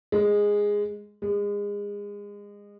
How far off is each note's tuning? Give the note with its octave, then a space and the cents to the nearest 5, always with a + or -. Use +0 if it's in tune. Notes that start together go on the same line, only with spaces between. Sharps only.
G#3 -10
G#3 -30